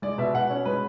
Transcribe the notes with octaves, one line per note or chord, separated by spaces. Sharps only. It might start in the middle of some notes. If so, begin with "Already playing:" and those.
G#3 D5
B2 E5
B2 F#5
C#4
G#3 B4